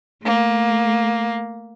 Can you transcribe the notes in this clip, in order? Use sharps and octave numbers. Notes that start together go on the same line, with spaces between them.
A3 A#3